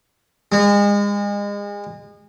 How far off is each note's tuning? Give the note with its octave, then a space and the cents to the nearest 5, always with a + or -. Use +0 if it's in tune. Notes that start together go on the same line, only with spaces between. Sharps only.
G#3 -35